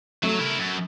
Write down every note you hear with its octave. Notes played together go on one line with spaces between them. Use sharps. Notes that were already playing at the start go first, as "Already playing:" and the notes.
F#3 A3
E4 A#4
F#2